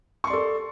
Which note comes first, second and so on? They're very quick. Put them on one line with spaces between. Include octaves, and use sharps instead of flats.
C#6 C6 D5 A4